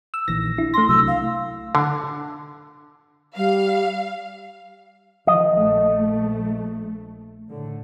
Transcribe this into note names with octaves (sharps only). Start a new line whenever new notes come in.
E6
A#1 D#3 E3 A#6
D4 E4
A3 C6 A#6
C2 C3 F#3 E6
F5
D3
G3 F5
D#3 F3 D#5
A#1 A3
A2 D3